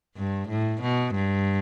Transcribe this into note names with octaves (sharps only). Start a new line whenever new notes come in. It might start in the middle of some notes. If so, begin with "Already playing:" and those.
G2
A2
B2
G2